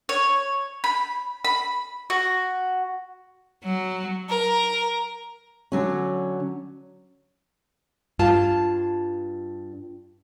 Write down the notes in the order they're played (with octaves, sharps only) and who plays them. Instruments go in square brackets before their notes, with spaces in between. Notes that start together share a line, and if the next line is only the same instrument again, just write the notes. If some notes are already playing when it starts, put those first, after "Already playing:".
[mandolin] C#5
B5
B5
F#4
[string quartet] F#3
A#4
[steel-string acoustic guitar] D3 F#3 C#4
[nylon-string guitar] G2 F4 A5